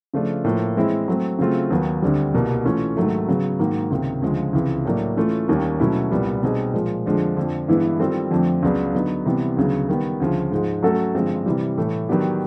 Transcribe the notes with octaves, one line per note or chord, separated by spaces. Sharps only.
C#3 F3 A3 D4 F4
A2 F3 A#3
E3 G#3 C4 E4
F#3 A3 C4
C#3 F#3 A3 C4 F4
D#2 D#3 F#3 B3
D2 D3 G3 C4
C2 B2 G3 A#3
E3 A3 C#4 F4
G#2 D#3 F#3 A3
C#3 F#3 B3
G#2 D#3 F#3 A#3
C#2 C3 D#3
D2 C#3 F3 G#3
C#2 C3 E3
A2 F#3 A#3 D4
E3 A3 C#4 F4
D#2 D#3 G3 A#3 C#4
B2 F#3 A3 C#4 E4
C2 A#2 G3 B3
B2 G3 C4 D#4 G#4
A#2 F3 G#3
F2 D3 F3 G#3
F2 D3 F3
G2 E3 G#3 B3 E4
D#3 G3 C4 F4 A4
F2 D3 F3 A3 C4
C#2 C#3 F#3 B3 D4
D3 F#3 B3 D#4
C3 E3 G3 B3
D2 C#3 F#3 B3
D#3 G3 B3
D2 C#3 F3
G#2 F3 G#3
F#3 A3 C#4 F#4 A4
G2 D3 F3 G#3 C4
C3 E3 G3
A2 E3 A3
D#3 F#3 B3 D4 G4